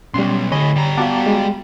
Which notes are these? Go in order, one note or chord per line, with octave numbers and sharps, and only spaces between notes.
B1 G3 C#4 C6
A2 D3 C#5 D#5 G#5 B5
G3 A#5
B3 F#4 F5 F#5 A5 D6
G#3